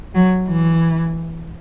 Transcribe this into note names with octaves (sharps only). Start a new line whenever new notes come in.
F#3
E3